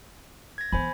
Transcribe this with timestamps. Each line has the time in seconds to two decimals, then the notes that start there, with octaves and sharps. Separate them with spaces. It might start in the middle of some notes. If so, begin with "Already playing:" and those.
0.58 G#6 A#6
0.73 E3 B3 C5 G#5 B5